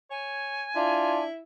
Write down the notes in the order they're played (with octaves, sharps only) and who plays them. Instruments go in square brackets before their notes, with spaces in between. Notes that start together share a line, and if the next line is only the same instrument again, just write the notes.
[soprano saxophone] C#5 [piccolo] G#5
[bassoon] D4 [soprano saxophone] E4 [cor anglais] F4